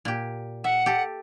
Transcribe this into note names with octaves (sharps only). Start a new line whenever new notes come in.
A#2 G4
E5 F#5
G4 A4